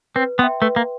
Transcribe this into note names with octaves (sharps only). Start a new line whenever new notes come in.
C4 B4
B3 E5 G5 C6
A3 B4
A#3